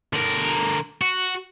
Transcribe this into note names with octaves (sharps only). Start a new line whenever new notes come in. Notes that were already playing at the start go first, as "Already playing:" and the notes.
D3 A#4
F#4